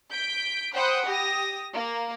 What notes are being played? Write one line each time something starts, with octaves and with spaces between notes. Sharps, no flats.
G6 B6 D7
C5 F#5 G5 B5 D#6 F#6
G4 D#6 A#6
A#3